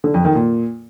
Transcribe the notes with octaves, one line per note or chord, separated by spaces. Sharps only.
D3
F2
D#3
A#2